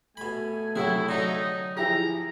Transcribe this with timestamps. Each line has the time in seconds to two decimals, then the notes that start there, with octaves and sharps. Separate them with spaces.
0.17 B2 A3 G#5 B5
0.76 F#2 C3 E4 F#4 G#4
1.09 D3 F#3 D#4
1.77 F3 E4 G4 G#4 A#5